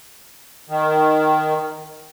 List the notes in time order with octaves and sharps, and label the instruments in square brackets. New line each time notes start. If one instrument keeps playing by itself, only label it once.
[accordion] D#3